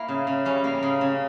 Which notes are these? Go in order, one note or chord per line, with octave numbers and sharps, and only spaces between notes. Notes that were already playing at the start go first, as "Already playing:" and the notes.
Already playing: A#3 E4
C#3
C#3
G3 C#4
A#3
C#3
C#3